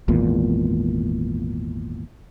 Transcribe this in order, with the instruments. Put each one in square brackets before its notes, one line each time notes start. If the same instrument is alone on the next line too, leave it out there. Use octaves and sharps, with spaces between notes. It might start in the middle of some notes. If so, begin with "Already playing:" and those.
[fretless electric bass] G#1 E2 A#2